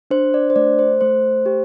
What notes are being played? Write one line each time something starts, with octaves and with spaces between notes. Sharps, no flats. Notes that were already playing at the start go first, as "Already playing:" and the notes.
D4 C5
D5
C5
A3 D5
C5
A3 C5
G4